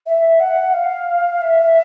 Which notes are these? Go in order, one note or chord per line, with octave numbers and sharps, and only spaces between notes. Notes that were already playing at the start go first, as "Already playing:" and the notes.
E5
F#5
F5
E5